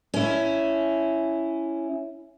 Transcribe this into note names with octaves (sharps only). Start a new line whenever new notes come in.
C#4 E4